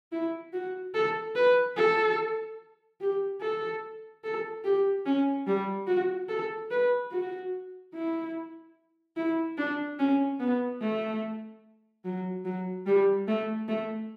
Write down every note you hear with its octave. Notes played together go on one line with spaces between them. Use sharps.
E4
F#4
A4
B4
A4
G4
A4
A4
G4
C#4
G3
F#4
A4
B4
F#4
E4
E4
D4
C#4
B3
A3
F#3
F#3
G3
A3
A3